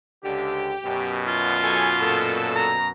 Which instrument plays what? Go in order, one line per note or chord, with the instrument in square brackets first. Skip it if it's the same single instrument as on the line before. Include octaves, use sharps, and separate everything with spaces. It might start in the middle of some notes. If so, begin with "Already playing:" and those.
[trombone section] C#2 D3 [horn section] G4
[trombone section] F#2 B2
[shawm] F4
[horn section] F#3 A4 G#5
A#2 A4
[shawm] A#5